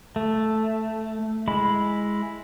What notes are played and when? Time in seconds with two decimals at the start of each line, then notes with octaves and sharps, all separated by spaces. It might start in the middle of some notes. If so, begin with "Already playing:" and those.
0.16 A3
1.48 G#3 E4 B5